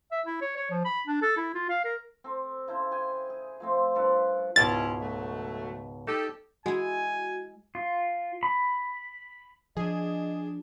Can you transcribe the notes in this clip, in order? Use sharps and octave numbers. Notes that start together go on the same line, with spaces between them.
E5
E4
C#5
C#5
F3
B5
D4
A4
E4
F4
F5
A#4
C4 A4
C#3 E4 A4 C5
G#4 G5 G#5
G#4
F3 A3 C4
G2 F3 A4 B4
C#2 G#2 B2 C#4 E4 F4 A6
F#3 A3
D#4 G4 A4
G#3 E4 F#4 G#5
F4
B5
F3 D4 G#4 D#5